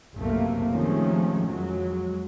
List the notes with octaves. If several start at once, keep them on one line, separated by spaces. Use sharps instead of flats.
F#1 B1 A2 C3 A3 A#3
C3 D#3 F3 G#3 A3 C#4
F2 F#3 G#3